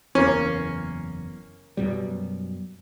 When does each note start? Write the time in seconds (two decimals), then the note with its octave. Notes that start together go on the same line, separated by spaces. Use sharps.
0.15 F#1 E2 A#3 C#4
1.77 F#2 B2 G3